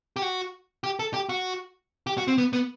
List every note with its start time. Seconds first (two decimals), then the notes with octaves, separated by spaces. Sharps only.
0.16 G4
0.22 F#4
0.84 G4
0.99 A4
1.14 G4
1.29 F#4
2.07 G4
2.18 F#4
2.27 C4
2.38 B3
2.53 B3